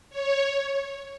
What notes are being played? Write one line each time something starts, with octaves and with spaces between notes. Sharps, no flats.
C#5